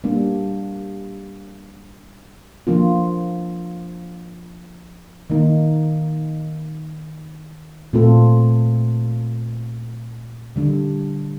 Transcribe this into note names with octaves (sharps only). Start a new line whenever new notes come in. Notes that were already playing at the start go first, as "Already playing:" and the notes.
G3 A#3 D4
F3 A#3 D4 F4
D#3 A#3 D#4
A#2 A3 C4 F4 A4
D3 G3 D4